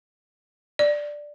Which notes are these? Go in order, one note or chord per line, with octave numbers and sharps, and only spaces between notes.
D5